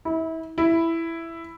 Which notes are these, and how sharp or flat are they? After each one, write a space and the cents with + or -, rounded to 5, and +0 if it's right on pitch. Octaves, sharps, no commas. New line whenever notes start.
E4 -30
E4 +5